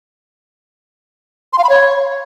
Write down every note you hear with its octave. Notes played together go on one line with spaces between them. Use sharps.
C6
F5
B5
C#5